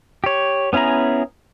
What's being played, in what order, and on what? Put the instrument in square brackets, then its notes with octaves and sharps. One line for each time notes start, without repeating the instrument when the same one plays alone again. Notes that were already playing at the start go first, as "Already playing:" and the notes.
[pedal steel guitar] G4 C#5
B3 C#4 E4 G#4 A#5